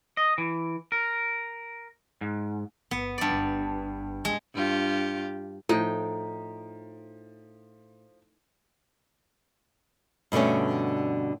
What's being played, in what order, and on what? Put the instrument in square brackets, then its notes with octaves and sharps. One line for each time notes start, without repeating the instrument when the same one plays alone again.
[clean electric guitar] D#5
E3
A#4
G#2
[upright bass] G1 [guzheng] B3
[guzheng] G2 D5
[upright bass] G1
[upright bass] C3 A#3 [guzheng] G#3
[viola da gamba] G2 F4 G4
[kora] A2 G5 [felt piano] F3 [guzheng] D#4
[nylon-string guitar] G2 B2 D3 A3 C#4